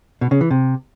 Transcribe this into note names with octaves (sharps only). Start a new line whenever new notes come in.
B2
C#3
E3
C3